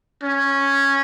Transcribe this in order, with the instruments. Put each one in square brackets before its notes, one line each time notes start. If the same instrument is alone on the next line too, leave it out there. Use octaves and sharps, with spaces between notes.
[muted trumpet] C#4